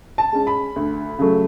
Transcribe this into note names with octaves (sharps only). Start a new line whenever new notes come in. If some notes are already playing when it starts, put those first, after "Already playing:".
A5
G#3 C#4
B5
D2
C#3 F#3 A3